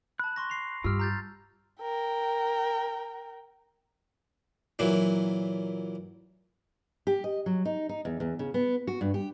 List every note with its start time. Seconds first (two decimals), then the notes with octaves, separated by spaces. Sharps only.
0.20 A5 B5 F#6
0.36 C6 C#6 A#6
0.50 C7 F7
0.84 G2 F4 G4 E6 F6
0.99 A#5 G6 A6
1.81 A#4 G5
4.79 A#2 E3 F#3
7.07 G4
7.24 D#5
7.46 F#3
7.65 D#4
7.89 D#4
8.05 E2
8.20 E2
8.39 C#3
8.54 B3
8.87 F#4
9.01 G2
9.14 G4